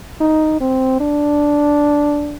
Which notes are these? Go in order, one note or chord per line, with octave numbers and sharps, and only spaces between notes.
D#4
C4
D4